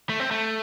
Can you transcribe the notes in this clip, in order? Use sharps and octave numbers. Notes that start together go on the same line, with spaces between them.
A3
C4
A3